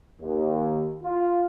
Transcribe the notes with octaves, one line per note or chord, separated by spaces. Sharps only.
D#2
F4